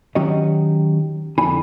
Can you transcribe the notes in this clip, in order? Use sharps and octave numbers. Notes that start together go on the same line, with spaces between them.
D#3 F#3 C#4 F#4 G4 D#5
F2 D3 D#4 E4 G#5 B5